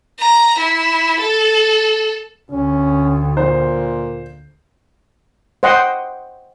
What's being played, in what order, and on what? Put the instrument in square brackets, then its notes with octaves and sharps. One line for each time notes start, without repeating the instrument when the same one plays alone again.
[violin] A#5
E4
A4
[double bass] D2 [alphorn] C#4
[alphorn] A#2 [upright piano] C5
[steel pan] C5 D#5 F#5 G5 C6